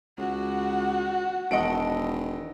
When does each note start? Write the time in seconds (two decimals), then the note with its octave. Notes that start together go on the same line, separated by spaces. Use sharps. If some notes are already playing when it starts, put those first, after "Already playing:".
0.18 C#2 F#4
1.51 E1 D#3 D#5 E5 F#5 A5 D7